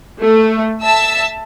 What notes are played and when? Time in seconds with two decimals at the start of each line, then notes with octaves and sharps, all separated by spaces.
0.21 A3
0.82 E5 A5 E6